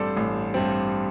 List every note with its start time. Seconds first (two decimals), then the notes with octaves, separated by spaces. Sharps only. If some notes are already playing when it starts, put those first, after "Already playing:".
Already playing: A1 G2 G3 C4 A4 C5 D5
0.17 A1
0.54 G2 G3 C4